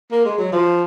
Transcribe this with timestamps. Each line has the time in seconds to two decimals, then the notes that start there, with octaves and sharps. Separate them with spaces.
0.12 A#3
0.25 G#3
0.38 F#3
0.52 F3